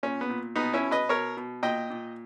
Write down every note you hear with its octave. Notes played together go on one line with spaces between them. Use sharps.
A#2 C#4
B3
A#2
B2 B3 D#4
C#4 E4
B2
B4 D#5
B2 A#4 C#5
B2
A#2 D#5 G5
A#2